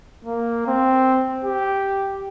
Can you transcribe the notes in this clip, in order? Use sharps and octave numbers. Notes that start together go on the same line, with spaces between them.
A#3
C4
G4